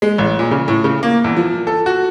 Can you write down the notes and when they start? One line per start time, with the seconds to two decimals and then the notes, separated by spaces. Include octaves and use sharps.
0.02 G#3
0.18 A1
0.39 A#2
0.51 C#3
0.68 A2
0.84 C#3
1.03 A#3
1.24 E2
1.37 F3
1.67 A4
1.86 F#4